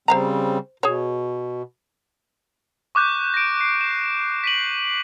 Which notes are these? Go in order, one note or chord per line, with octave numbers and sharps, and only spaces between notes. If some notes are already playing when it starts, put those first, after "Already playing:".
C#3 G3 C4 C5 F5 A#5
B2 G#4 C#5
C#6 D6 F#6 G6
A#6 D7
C7
E7
B6 D#7 F#7